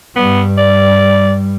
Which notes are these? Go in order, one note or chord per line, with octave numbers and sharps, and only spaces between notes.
G2 G3 B3
D5